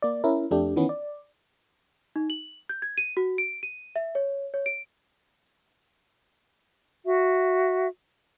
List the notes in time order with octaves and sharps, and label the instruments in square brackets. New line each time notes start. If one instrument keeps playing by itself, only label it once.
[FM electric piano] A#3 D5
C#4 E4 A#4
F2 A3 D4 G4
D#3 E3 B3 C#4
D5
[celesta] D#4
F#7
G6
G#6
D#7
F#4
D7
D#7
E5
C#5
C#5
D7
[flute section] F#4 E5